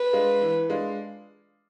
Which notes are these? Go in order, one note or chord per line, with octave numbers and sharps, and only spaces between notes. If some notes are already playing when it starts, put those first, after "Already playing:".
Already playing: B4
G#3 D4 F4
E3
G#3 D4 F4